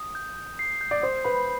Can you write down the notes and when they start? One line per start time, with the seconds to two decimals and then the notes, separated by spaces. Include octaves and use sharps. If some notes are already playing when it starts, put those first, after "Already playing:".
Already playing: D#6
0.15 G6
0.37 G6
0.59 C7
0.81 G6
0.91 D5
1.02 C5 D#6
1.25 B4 B5